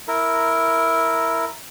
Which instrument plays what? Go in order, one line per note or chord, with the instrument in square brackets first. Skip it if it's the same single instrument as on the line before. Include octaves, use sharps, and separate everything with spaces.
[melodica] E4 A#4